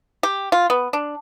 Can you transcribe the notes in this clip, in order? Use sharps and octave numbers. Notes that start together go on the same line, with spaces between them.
G4
F4
B3
D4